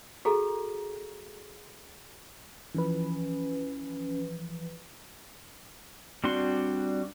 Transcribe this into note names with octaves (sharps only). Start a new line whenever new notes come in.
F#4 G#4 A4 A#5
E3 F3 C#4 B4
G3 C4 D4 F#4 C6